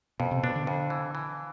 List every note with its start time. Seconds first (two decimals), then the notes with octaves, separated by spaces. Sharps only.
0.20 F2 B2
0.31 C3
0.43 B2 D4
0.55 D3
0.67 F2
0.90 E3
1.15 E3